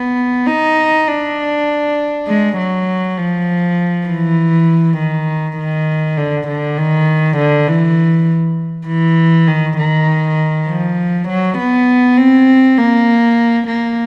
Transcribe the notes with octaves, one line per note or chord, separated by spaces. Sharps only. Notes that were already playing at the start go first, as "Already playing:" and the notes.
Already playing: B3
D#4
D4
G#3
F#3
F3
E3
D#3
D#3
D3
D3
D#3
D3
E3
E3
D#3
D#3
F3
F#3
B3
C4
A#3
A#3